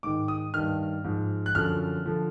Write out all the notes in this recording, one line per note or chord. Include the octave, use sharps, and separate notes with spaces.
G#2 D#3 D6
D#6
G2 D#3 F6
G#2 F3
F#6
F#2 D3 F3 F6
D3 F3